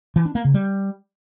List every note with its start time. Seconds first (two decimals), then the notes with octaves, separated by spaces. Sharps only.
0.16 E3
0.25 D4
0.35 A#3
0.45 C#3
0.54 G3